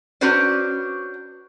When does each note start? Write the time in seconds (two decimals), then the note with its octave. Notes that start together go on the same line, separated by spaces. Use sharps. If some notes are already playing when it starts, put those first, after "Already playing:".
0.21 C#4 D4 F#4 B4 C5 D5